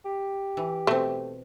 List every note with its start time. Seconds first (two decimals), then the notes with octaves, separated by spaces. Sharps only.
0.05 G4
0.57 E3
0.87 B2 A3 C4